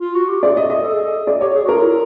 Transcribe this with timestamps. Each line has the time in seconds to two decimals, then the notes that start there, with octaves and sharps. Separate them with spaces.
0.01 F4
0.15 F#4
0.28 G4
0.42 G#4 D5
0.57 D#5
0.70 D#5
0.81 A4
0.93 G#4
1.03 A4
1.26 G#4 D5
1.41 G4 C#5
1.55 G#4
1.64 F#4
1.69 F4 A#4
1.83 E4